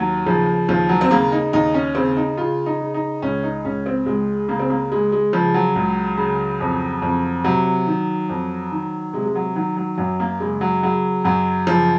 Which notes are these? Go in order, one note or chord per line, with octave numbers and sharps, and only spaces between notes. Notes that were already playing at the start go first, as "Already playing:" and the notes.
Already playing: D#2 F#3
C#3 F3
D#2 F3
F#3
C4
C#3 A#3
D#4
D#2 D#4
C#4
C#3 C4
D#4
C#3 F4
D#4
C#3
D#4
C#2 C#4
D#4
C#2 C#4
C4
C#2 G#3
C#3 A#3
C4
A#3
C#3 G#3
G#3
C#3 F3
F#3
C#2
C#3
F2
F2
C3 F#3
D#3
F2
D#3
C3 G#3
G#3
F#3
D#3 F#3
F#3
F#2 F#3
A#3
C#3 G#3
F#3
C#3 F#3
F#2 F#3
C#3 F3